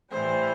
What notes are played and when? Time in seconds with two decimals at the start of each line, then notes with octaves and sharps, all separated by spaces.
0.11 A2 E3 G3 C5